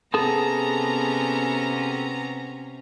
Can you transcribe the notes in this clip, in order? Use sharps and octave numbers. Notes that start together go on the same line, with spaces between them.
C3 B3 C#4 G#4 A4 A5 A#5